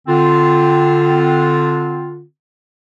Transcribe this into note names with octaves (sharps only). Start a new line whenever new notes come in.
D3 C4 F4